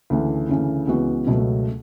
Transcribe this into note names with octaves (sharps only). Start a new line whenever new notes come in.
D2 C#3 E3
D2 C#3 E3
C#2 C#3 E3 B3 F#4
C#2 B2 F#3 A3